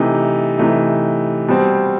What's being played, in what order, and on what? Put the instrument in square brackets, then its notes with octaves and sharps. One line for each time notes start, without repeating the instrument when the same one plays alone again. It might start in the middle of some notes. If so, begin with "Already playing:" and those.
Already playing: [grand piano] C3 E3 A3 D#4
C3 E3 A3 D#4
B2 G3 C4